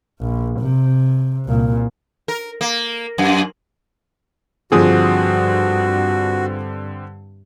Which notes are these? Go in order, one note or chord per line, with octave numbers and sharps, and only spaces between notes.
A#1
C3
C2 A#2
A#4
A#3
F#2
G2 D3 F3 C4 F#4 G#4 D#6